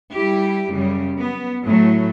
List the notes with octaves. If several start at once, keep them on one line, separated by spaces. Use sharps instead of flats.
G3 E4 G4
F#2 C#3 G3
B3
A2 F#3 A3